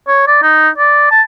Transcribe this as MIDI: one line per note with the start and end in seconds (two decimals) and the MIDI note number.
0.08 0.23 73
0.27 0.40 74
0.43 0.69 63
0.78 1.06 74
1.11 1.21 81